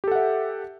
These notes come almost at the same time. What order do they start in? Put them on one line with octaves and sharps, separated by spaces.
G4 A4 F#5 E5